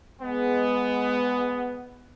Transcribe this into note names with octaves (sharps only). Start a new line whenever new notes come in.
G#3 B3